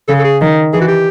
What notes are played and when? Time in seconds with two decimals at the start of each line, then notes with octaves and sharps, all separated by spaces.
0.08 C#3 A4
0.19 A4
0.24 G#4
0.40 D#3
0.72 E3 G#4
0.81 F#4
0.88 G4